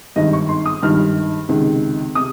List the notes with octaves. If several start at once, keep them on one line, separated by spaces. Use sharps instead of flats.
G#1 G2 D#3 D#5
C#6
C6
D#6
G#1 G2 D#3 F6
C#2 C3 D#3
C3 D#6